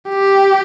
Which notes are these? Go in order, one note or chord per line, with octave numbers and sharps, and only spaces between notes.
G4